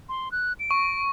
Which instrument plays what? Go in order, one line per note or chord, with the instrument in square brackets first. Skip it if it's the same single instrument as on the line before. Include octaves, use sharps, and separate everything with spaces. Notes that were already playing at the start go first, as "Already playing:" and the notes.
[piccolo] C6
F#6
D7
[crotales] C#6